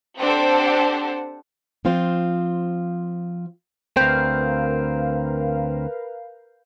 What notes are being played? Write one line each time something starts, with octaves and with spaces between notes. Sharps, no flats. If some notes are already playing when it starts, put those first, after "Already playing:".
C4 D4 G4 A4 C5 F#5
F3 C4 F4 C5
D2 C4 A#4 B4 F5 G6